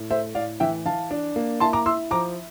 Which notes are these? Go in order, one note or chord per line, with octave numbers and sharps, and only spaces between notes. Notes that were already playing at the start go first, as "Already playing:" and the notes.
Already playing: A2
A3 C5 E5
A2 D5 F5
E3 E5 G5
E3 F5 A5
D4
A#3
E4 A5 C6
A#5 D6
E4 C6 E6
F3 A#5 D6